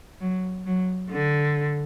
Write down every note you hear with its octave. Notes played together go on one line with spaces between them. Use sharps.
F#3
F#3
D3